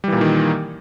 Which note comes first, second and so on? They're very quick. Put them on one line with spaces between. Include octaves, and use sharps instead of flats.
G3 E3 A#2 A#3 D#3